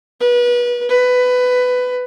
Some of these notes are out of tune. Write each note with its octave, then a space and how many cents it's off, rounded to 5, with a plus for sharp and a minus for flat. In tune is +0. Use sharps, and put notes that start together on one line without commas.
B4 -30
B4 +15